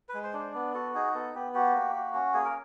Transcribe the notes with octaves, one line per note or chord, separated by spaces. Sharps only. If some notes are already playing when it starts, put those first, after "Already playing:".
B4
G#3
C5
D4
C5
B3
F#4 A4
D#4 G#4
B3 A4
B3 G4
F#4 G4
A#3
F#4
C#4
A#3 G#4
A#4